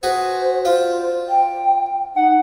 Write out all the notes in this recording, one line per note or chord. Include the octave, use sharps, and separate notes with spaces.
F#4 G#4 B4 C5
F4 C5 D5
G5
D#4 F#5